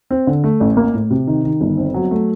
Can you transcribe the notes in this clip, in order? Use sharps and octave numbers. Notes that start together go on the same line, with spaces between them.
C4
D3
A3
A1
A#3
A2
C3
D#3
D#3
G1
C4
F#3
A3